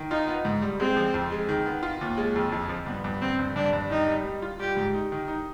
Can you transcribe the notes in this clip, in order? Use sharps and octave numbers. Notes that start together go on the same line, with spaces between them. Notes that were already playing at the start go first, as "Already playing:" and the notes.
Already playing: D#3
D#4 F4
B3
G#2
G3
G#3 C4
F3
F2
G#3
D#3
B3
F4
D#2
G#3
F2
F2 G#3
F3
G2 B3
G2
G2 C4
G2
G2 D4
G2
D#3 D#4
G3
G3
F4
G3 G4
G#2
D#4
D#3
D#4